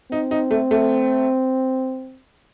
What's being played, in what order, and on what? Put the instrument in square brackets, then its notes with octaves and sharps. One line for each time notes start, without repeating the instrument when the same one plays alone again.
[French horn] C4 [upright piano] D#4
[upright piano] D#4
A3
A3